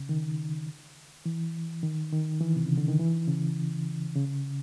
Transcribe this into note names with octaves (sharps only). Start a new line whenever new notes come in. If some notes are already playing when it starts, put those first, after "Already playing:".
Already playing: C#3
D#3
E3
D#3
D#3
E3
C3
C#3
D3
D#3
E3
C#3
C#3